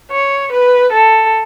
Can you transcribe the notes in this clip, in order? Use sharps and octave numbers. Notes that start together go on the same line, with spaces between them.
C#5
B4
A4